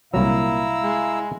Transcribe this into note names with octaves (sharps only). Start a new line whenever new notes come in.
C2 A#2 F#3 E4 F5 A#5 E6
G#3